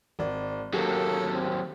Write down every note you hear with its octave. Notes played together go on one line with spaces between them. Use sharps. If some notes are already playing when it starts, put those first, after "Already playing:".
G#1 D5
D#2 F#3 A#3 G4 A4
C4